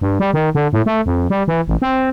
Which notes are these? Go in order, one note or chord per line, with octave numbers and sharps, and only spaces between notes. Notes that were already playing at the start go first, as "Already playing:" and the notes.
G2
G3
D#3
D3
A2
A3
F2
G3
E3
A1
C4